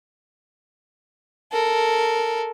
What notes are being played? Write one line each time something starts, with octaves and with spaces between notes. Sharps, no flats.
A4 A#4